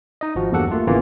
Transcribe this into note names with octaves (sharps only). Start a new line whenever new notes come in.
D#4 D#5
G#1 F3 F#4
E2 G2 A#3 G4 A4 F#5
A3 A#3 F4
G#1 C#3 E3 A#3 B3 F4